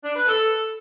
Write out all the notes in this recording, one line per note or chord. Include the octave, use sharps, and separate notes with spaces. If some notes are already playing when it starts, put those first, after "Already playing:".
D4
B4
A4